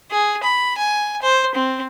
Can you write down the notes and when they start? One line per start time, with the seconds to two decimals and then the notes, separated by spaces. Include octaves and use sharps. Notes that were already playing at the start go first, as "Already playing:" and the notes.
0.11 G#4
0.43 B5
0.78 G#5
1.22 C5
1.55 C4